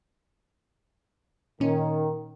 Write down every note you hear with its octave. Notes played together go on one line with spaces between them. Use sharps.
A#2 D#3 C#4